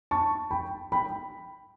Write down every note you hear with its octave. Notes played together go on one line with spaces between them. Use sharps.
A5 C#6
G5 B5
G5 B5